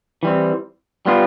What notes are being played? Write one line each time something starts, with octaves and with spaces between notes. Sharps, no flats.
E3 G3 C4
G3 B3 F4